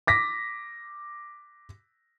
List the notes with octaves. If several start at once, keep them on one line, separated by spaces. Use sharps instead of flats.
D6 A#6 B6